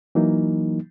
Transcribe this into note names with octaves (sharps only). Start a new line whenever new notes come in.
E3 F#3 A#3 D#4